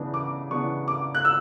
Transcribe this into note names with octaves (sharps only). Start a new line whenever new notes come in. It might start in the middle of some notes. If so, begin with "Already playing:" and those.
Already playing: C#3 E3 B3 D4
D6
C#3 E3 B3 D4 C#6
D6
F#6
E6